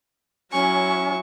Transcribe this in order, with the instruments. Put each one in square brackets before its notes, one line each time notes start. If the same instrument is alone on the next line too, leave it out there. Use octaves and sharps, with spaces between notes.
[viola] F#3 [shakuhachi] C#4 [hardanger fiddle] E4 C#6 [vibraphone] G#5